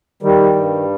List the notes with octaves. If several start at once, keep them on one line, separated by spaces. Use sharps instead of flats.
D#3 G3
G2